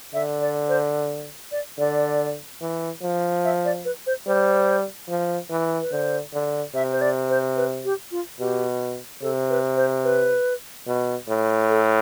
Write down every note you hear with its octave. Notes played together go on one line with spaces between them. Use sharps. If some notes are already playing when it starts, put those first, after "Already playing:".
D3 E5
D5
C5
D5
D3 D5
E3
F3
E5
D5
B4
C5
G3 C5
F3
E3
B4
D3 C5
D3
C3 E5
C5
D5
C5
B4
G4
F4
B2 G4
C3 A4
B4
C5
B4
B2
A2
A4